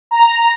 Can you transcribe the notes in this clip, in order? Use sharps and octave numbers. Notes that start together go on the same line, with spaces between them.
A#5